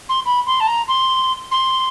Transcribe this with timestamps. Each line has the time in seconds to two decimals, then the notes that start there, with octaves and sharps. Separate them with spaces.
0.08 C6
0.25 B5
0.46 C6
0.60 A5
0.67 A#5
0.87 C6
1.51 C6